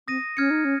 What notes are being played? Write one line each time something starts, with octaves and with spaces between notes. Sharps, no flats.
C4 D#6 A#6 D#7
C#4 F6 G#6 C#7
D#4
C#4